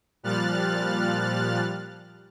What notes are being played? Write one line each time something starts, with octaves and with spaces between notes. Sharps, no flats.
A#2 F3 G3 F6 F#6 A6